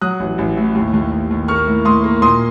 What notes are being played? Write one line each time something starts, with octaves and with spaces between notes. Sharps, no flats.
F#3 D#6 F#6
A1
A1
A2
D#2
D#2
D#2
D#2
A#3 C#6 F6
A2
A2 C6 D#6
A#3
A#2 C6 D#6